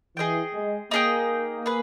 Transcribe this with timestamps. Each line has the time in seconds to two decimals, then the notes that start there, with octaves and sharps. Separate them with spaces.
0.16 E3 G#4 D#5 G5
0.54 G#3
0.91 A#3 D#4 G#4 D#5 G5
1.66 G#4 B4